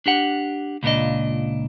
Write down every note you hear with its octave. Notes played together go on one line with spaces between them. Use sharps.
D4 G4 F#5
C#2 A#2 D4 D#5